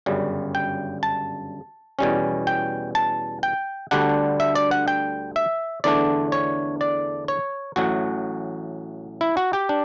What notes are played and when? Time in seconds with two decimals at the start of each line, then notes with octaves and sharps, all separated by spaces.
0.06 G1 F#2 C#3 G3
0.55 G5
1.03 A5
1.99 E2 B2 G3 C#4
2.47 G5
2.95 A5
3.43 G5
3.91 D2 D3 G3 D4 F#5
4.40 E5
4.55 D5
4.71 F#5
4.88 G5
5.36 E5
5.84 E2 D3 A3 D4 D5
6.32 C#5
6.81 D5
7.28 C#5
7.76 A1 A2 F#3 F#4
9.21 E4
9.37 F#4
9.53 G4
9.69 D4